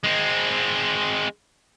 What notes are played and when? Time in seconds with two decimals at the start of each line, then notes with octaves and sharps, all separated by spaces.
0.04 G#3 C4